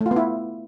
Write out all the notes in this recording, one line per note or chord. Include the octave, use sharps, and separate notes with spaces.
A3
F4
B3
E4